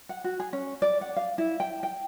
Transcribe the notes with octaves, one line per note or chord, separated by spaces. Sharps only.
F#5
F#4
G#4
C#4
D5
F#5
F5
E4
G5
G5